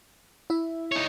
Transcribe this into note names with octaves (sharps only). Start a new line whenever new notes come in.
E4 E5
D#4 C#5